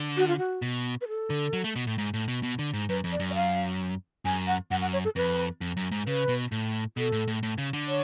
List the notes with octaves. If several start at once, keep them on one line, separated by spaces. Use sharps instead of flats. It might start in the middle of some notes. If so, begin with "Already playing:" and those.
Already playing: D3
F#4
F4
F#4
B2
B4
A4
D3
F#3
A3
B2
A2
G#2
A2
B2
B2
D3
G#2
F#2 B4
F2
D5
F#2
D5
F5
F#2 G#5
F#5
F#2 F#5
F#5
C#5
A4
F2 B4
F2
F#2
G#2
C#3 B4
B2
A2
B2 A4
A2
A2
A2
C#3
D3
C#5